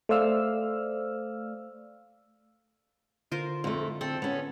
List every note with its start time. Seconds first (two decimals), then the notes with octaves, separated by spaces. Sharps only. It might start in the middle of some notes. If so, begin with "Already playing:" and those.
0.09 A3 C5 D5 F5 E6 F6
3.32 D3 F4 A#4 C5
3.64 F2 A3
4.01 C4 A4
4.22 B3 C#4